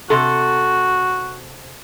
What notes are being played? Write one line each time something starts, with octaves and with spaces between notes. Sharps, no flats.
C3 F#4 A4